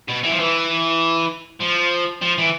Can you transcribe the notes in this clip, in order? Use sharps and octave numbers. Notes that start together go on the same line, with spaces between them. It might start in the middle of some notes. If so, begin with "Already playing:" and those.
B2
E3
F3
E3
F3
F3
E3